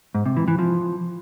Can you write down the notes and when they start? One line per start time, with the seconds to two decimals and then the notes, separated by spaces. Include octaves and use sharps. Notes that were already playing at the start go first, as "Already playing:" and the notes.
0.15 G#2
0.26 C3
0.37 E3
0.48 E3
0.59 F3